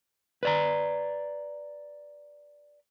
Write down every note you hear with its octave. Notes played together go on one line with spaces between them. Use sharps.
B4 D5 A#5